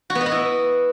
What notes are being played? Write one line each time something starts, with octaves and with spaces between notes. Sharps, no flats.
F#4
B3
D#5
B3
E4